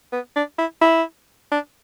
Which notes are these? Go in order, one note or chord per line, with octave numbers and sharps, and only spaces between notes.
B3
D4
E4
E4
D4